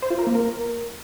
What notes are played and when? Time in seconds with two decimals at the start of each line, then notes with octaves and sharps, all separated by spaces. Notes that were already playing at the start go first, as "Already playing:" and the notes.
0.02 C5
0.11 F4
0.19 A#4
0.27 A#3
0.35 A#4